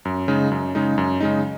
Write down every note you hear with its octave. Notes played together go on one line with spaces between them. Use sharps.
F#2
C#3 G#3 D#4
F#2
C#3 G#3 D#4
F#2
C#3 G#3 D#4